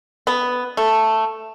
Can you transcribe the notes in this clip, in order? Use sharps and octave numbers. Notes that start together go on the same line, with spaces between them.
B3
A3